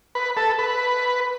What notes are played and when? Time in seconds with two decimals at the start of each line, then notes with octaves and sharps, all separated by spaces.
0.15 B4
0.37 A4
0.59 B4